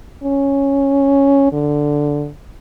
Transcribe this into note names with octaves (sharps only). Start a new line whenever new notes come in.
C#4
D3